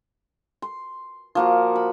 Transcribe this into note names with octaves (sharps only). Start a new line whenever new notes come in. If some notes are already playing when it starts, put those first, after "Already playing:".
C6
F3 A#3 F#4
B5